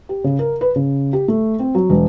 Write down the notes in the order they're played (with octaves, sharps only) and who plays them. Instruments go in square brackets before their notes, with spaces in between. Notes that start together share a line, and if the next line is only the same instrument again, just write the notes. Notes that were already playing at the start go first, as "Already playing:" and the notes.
[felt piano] G4
C#3
A#4
B4
C#3
G4
A3
C4
F#3
E1